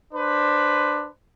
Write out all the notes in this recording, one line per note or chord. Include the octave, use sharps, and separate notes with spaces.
D4 B4 C5